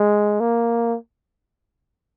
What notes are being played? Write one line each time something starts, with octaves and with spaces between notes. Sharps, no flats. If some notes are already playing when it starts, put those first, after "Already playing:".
Already playing: G#3
A#3